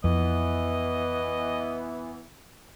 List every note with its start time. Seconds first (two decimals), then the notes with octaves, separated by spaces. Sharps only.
0.04 F2 E3 B3 D#5